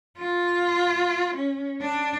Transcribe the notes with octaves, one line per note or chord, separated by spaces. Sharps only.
F4
C#4
D4